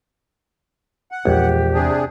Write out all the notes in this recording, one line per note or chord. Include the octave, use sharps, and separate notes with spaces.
F#5
A#1 E2 G#3 G4
C3 D4 G#4